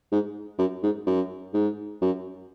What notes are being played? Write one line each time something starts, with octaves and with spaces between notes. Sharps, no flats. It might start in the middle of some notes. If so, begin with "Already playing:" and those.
G#2
F#2
G#2
F#2
G#2
F#2